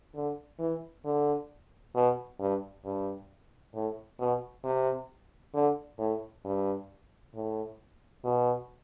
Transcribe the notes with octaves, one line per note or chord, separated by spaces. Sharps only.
D3
E3
D3
B2
G2
G2
A2
B2
C3
D3
A2
G2
A2
B2